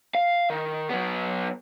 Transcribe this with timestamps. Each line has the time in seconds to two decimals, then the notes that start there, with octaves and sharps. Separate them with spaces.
0.15 F5
0.50 D#3
0.89 F#3 B3